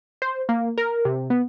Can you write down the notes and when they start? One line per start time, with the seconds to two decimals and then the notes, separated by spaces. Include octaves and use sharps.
0.22 C5
0.49 A#3
0.78 A#4
1.05 C3
1.30 B3